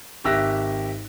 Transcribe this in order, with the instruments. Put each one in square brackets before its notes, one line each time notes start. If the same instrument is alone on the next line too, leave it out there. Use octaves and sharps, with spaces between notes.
[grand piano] G#1 G4 E5 E6 F#6 A#6